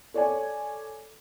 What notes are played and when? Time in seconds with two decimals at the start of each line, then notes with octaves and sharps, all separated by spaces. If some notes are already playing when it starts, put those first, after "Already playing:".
0.14 A4 C#5 D5 G#5